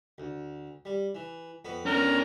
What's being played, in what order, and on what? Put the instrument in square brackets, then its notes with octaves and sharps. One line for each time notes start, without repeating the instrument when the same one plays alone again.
[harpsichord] D2
G3
E3
F2 B3 B4
[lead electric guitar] C#4 D4 [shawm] A#4